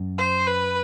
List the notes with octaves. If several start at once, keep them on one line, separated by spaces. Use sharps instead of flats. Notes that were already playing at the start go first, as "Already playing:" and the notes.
Already playing: F#2
C5
B4